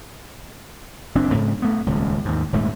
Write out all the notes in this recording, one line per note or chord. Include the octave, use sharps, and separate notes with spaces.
F#1 C4 D4
G#2 C#3
A3 B3
D#1 C#2
D#2 G#2
D#1 G#2 A3